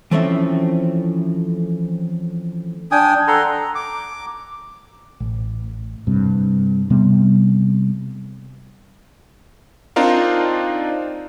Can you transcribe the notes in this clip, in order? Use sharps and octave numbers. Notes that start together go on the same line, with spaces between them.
E3 F3 A3 C4 C#4 E5
D4 G5 G#5 D#6
A4 F#5 A#5 C6
A#5
D6
A1
G2 C3
C3 G3 B3
C4 D4 D#4 F4 A#4 F5